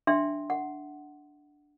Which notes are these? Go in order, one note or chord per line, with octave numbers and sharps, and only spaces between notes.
D4 E5 G5 C6
F#5